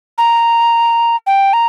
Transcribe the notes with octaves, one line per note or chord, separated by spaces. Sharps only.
A#5
G5
A#5